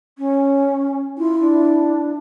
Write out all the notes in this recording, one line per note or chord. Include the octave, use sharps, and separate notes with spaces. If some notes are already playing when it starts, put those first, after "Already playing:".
C#4
E4 F4
D4